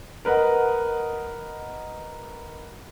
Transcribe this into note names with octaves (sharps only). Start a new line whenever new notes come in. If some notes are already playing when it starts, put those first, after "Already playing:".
A#4 B4 D#5 F#5